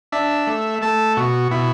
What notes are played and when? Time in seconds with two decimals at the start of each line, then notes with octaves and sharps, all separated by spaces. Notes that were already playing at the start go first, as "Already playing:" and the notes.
0.12 D4 E5
0.47 A3
0.82 A3 A5
1.17 B2 F#4
1.51 B2 E4